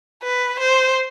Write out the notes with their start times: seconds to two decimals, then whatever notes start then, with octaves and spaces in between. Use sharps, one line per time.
0.23 B4
0.59 C5